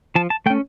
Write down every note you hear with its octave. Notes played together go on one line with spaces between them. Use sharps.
F3 A5
A5
A3 C#4 G5